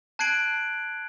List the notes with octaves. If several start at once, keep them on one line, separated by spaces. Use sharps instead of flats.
A5 F#6 G#6 C7 D7 F#7